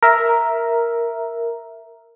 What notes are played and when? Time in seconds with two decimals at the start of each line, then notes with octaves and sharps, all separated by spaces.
0.03 A#4 E5